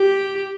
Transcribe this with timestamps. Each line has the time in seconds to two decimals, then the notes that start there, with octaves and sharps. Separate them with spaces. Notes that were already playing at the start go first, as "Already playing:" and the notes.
Already playing: G4